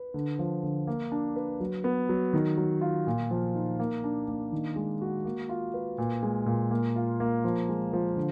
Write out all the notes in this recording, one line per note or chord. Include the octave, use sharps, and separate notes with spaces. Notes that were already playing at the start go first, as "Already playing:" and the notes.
Already playing: B4
D3
F3
D3
A#3
D4
B4
F#3
B3
F#3
D#3
F#3
F4
A#2
F3
D#4
A#3
D4
A#3
D#3
G#3
F#4
A#3
F4
B4
A#2
G#3
A#2
A#3
F4
A#3
F3
G#3
F3
D3